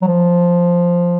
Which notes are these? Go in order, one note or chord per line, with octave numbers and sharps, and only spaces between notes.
F#3
F3